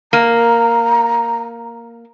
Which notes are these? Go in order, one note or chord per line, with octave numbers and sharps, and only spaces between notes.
A#3 A#5